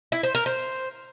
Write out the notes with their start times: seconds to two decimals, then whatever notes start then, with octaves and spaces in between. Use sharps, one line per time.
0.12 E4
0.23 C5
0.35 A#4
0.46 C5